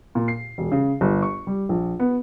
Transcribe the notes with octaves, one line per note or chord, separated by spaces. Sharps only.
A#2
C7
E1
C#3
G1
C#6
G3
A#1
B3